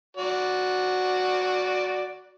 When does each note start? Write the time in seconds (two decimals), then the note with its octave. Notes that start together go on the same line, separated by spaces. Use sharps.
0.17 F#4 D5